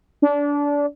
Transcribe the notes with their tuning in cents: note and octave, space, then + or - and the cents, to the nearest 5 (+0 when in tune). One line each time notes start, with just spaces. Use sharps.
D4 -25